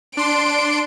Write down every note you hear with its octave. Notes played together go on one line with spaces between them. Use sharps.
D4 C6 D7